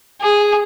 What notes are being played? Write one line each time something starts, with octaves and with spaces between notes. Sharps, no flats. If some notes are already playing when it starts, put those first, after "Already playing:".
G#4